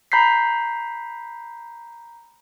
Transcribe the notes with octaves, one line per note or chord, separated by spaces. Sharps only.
A#5 B5 G6 B6 C7